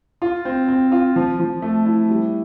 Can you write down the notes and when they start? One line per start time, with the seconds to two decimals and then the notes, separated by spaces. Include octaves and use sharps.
0.22 F4
0.45 C4
0.68 C4
0.92 F4
1.16 F3
1.40 F3
1.62 A3
1.86 E4
2.09 G3